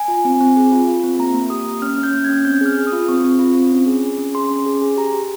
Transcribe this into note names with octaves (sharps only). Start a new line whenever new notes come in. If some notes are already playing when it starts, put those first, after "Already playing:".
Already playing: G#5
F4
C4
C4
G#4
F4
F4
C4
A#3 A#5
A#3
G4 D#6
A#3
C#4 F6
C#4
G6
A#3
C#4 G#6
C4 G6
G#4 F6
G#4
D#6
F4
C4 C#6
C4
F4
C4
C#4
G#4
G#4
C#4
G#4 C6
C#4
G#4
G#4
G4 A#5
G4